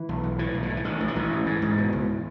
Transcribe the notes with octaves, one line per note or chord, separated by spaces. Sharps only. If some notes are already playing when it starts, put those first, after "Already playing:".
Already playing: E3
B1
B1
A2 E3
B1
E3
A2
E3
A1 D#3
A1
E3
A1
G#2
G#2
G#2
B2
C#2